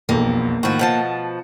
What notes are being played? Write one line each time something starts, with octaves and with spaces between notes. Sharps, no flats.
E1 B1 F2 A#3
A2 D#3 F3 F#4
B2 F3 F#5 A5